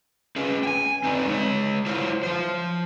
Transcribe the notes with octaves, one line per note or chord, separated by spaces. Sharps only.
C#4 G#4 B4
G5 G#5
C4 D#4 B4 D5
G#3 C#5
E4 F4 C5 C#5
F3 C5